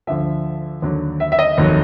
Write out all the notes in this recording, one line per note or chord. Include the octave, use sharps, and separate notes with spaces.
D2 D3 F3 E5
D#2 D3 F#3
E5
E5
D#5
F1 D#2 D#3 F#3